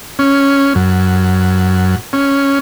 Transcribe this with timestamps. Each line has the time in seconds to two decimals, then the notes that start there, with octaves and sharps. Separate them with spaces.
0.19 C#4
0.75 F#2
2.13 C#4